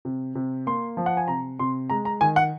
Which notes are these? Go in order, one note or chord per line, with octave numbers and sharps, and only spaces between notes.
C3
C3
A#3 C6
F3
F#5
G#5
C3 A#5
C3 C6
G#3 A#5
A#5
D#3 G#5
F#5